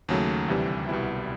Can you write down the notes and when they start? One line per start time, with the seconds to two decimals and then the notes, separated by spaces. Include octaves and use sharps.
0.09 D#2 C#3 F#3 A3
0.48 D2 C3 E3 G3
0.89 C2 B2 G3 B3 E4